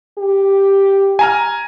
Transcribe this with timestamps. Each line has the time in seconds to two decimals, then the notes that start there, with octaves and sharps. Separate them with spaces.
0.18 G4
1.19 G#5 A#5 F6